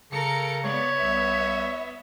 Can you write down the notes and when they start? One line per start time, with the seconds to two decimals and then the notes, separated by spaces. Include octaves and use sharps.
0.12 C#3 A4 A#4 C#7
0.64 B3 C#5 D5
0.97 C2 E5